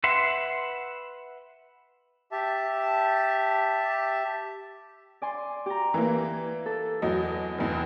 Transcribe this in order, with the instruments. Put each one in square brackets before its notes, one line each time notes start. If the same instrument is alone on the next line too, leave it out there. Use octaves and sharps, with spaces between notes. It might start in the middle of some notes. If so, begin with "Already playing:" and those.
[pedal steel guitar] B4 E5 F#5 C6
[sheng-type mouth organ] G4 E5 A5
[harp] D5 G#5 C6
G4 A#5
[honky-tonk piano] E3 A#3
[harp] A4
[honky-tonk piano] E2 F#3 D#5
F1 E2